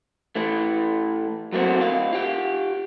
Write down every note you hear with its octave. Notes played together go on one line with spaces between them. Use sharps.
A2 E3 A3
F#3 A3 A#3 C4 F#4
D2 F5
F4 G4